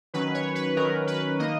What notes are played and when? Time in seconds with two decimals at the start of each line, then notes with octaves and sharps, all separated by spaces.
0.14 D#3 F#3 C#4 B4
0.34 C#5
0.55 B4
0.76 D#3 F#3 C#4 A#4
1.07 B4
1.39 D#3 A#3 D#4 D#5